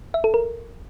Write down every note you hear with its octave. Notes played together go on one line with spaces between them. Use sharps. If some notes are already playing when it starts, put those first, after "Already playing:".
E5
A4
A#4